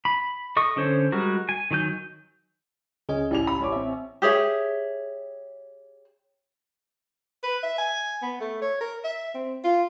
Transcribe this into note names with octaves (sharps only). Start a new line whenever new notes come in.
B5
A4 D#5 C#6 D#6
D3 C#4 A4 C5 C#5
G3 G#3 F#4 A#4
G#5
D#3 F#3 G#5 G6
C#2 C#4 G#4 D#5 G#5
A1 E4 G4 D5 F7
B5
A1 C#5 D6
C4 E5
G4 G#4 C#5 E5
B4
E5
G#5
B3
A3
C#5
A#4
E5
C4
F4